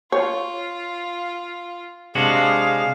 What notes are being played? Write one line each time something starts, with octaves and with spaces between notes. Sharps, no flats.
F4 C#5
C3 G#3 D4 F#4 G#4 F5